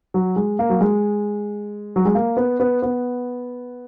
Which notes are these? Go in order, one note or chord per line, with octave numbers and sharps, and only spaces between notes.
F#3
G#3
A#3
F#3
G#3
F#3
G#3
A#3
B3
B3
B3